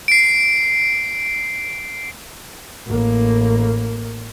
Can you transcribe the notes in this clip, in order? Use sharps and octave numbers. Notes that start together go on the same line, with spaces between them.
C7 D7
A1 A#3